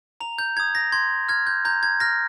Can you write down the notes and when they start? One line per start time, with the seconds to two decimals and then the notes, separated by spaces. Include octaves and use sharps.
0.20 A#5 F7
0.38 G6
0.56 D#6 G6 G#6
0.75 A#6
0.92 C6 G#6
1.29 F6 G#6
1.47 G6
1.65 A#5 G6
1.83 G#6
2.00 F6 A#6